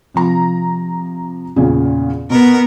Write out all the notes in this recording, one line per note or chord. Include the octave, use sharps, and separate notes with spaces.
C3 F3 A#5
E2 A#2 C#3
B2 B3 A#4